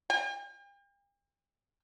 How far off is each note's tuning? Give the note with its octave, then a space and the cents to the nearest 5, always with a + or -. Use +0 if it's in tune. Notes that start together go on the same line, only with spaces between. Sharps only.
G5 +45